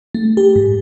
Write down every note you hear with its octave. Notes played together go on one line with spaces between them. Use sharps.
A3
G4
G#2